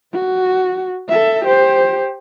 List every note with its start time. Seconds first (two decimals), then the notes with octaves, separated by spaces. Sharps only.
0.13 F#4
1.09 A4 E5
1.45 G4 C5